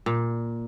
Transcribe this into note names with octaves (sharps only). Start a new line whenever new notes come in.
A#2